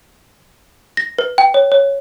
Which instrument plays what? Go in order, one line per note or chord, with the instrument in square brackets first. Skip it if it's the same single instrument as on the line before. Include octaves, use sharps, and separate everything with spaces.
[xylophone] A#6
B4
G5
C#5
C#5